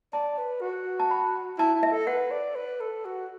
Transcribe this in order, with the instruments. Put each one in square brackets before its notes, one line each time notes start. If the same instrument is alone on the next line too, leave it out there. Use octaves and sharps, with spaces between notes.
[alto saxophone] D5 [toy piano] A5
[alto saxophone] B4
F#4
[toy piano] A5
B5
[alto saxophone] E4 [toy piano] A5
[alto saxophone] E4
[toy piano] E5
[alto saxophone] A4
[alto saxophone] B4 [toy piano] F#5
[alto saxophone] D5
B4
A4
F#4